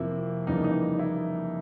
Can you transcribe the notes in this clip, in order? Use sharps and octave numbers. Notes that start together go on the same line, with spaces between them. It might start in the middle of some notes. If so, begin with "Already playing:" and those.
Already playing: F2 C3 F3 A#3 E4
F2 C#3 E3 G3 A#3 D#4
D#4
E4